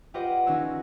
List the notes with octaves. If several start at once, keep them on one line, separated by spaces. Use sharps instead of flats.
F4 G4 B4 D5 D#5 F#5
D#3 C#4 D#4 F#4 C#5 E6